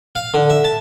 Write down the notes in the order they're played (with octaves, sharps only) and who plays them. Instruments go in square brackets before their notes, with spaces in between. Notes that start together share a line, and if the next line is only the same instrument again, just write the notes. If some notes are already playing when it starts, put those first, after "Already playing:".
[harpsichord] F5
D3
E5
A5